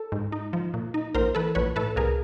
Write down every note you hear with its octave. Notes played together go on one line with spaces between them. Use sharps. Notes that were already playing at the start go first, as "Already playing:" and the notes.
Already playing: A4
G#2
D#4
F3
A#2
D#4
A#1 A#4 C5
E3 A4 B4
A#1 B4 C#5
A2 A4 B4
C2 G#4 A#4